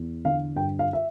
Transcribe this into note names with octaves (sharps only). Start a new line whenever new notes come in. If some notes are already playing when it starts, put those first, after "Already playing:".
Already playing: E2
D3 F5
G2 G5
F5
E5